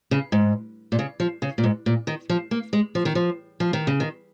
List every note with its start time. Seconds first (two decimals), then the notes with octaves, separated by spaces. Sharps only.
0.11 C#3
0.32 G#2
0.92 A#2
0.99 C#3
1.20 F3
1.42 C#3
1.58 A#2
1.64 G#2
1.86 A#2
2.07 D#3
2.29 F3
2.51 A#3
2.73 G#3
2.95 F3
3.05 D#3
3.15 F3
3.60 F3
3.73 D#3
3.87 C#3
4.00 D#3